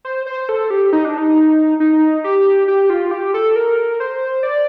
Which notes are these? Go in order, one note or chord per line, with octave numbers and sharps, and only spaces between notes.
C5
C5
A4
G4
D#4
D4
D#4
D#4
G4
G4
F4
G4
A4
A#4
C5
D5